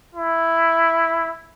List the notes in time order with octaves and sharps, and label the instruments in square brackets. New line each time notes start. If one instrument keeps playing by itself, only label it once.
[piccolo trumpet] E4